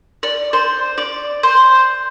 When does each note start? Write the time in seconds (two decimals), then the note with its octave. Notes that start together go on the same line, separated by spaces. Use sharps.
0.23 D5
0.53 C5
0.98 D5
1.43 C5